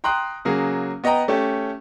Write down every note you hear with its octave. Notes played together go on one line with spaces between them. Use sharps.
G5 A#5 C6 D#6 F#6
C#3 F#3 A#3 G#4
B3 D#5 G5 A#5
A3 C#4 G4